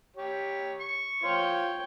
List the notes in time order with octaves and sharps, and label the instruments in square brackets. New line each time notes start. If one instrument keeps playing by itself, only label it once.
[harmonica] G4 C#5
[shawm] C#6
[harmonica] F4 C5 [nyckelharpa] C#5 G5